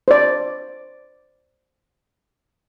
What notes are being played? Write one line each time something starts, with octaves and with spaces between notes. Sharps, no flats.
C5 D5